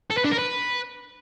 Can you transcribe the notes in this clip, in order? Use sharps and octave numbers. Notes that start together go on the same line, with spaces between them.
A4
B4
D4
A#4
B4